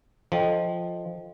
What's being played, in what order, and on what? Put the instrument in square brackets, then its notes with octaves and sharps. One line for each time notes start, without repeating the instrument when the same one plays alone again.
[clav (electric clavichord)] F3 [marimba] A4 D#5 G5